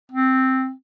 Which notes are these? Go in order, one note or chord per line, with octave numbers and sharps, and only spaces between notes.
C4